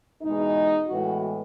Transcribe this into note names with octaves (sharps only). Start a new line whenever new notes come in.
E2 B2 G#3 D#4
A2 E3 G#3 B3 F#4